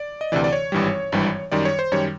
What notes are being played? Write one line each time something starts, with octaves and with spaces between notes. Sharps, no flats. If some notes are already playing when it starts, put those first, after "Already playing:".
Already playing: D5
D#5
D2 C3 E3 D5
D5
C#5
G#1 G2 E3 G3
G#1 G2 E3 G3
F#2 D#3 G3 D5
C#5
C5
F#2 D#3 G3 C#5